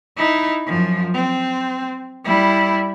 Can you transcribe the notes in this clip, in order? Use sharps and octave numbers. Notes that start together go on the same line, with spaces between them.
D#4 E4
F#2 F3
C4
G3 E4